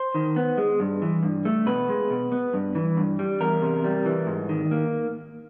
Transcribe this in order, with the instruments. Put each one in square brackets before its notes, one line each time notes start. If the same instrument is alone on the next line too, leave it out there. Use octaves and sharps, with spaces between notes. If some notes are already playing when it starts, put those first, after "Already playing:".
Already playing: [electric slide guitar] C5
D#3
B3
G#3
G2
E3
G2
A3
B2 B4
G#3
B2
B3
G2
E3
G2
G3
E2 A#4
C3
G3
E3
G#2
D#3
A#3